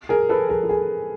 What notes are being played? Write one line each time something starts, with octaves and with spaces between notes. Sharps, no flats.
G#4 A#4
A4 B4
G#4 A#4
A4
G#4 A#4